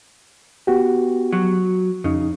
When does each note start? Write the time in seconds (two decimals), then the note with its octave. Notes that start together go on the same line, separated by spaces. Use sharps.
0.67 B3 F#4 G4
1.33 F#3
2.04 F2 C#3 D#4